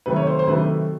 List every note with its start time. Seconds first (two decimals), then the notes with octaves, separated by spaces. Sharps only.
0.06 C3 D#3 F#3 A3 B4
0.16 C#5
0.27 C5
0.39 C5
0.47 C3 D#3 F#3 A3 B4